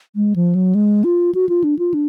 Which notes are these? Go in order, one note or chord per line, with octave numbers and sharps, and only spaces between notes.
G#3
F3
F#3
G#3
F4
F#4
F4
D4
F4
D4